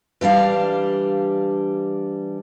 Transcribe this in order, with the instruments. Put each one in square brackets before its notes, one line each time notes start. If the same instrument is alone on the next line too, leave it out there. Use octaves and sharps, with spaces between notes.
[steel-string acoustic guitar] E3 G3 D4 F5